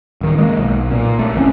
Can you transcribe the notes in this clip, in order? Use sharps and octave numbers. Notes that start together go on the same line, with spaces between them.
D1 D#3
D#3 G#3 A#3
B1
A#2
A#1 A3
F#1 E3 C4 C#4